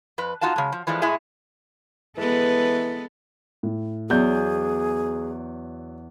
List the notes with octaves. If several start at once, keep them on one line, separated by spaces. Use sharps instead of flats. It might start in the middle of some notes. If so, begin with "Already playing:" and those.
F2 B4
D#4 F4 F#4 F5 A5
C#3 G#3
F3
E3 F3 G#3 A3 D4
A2 G#3 E4 G#4
E3 G#3 B3 A4 B4
A2
E2 F#3 G#4 D5 G6